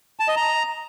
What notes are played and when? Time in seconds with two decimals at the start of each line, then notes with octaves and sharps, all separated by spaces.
0.20 A5
0.28 D#5
0.36 A#5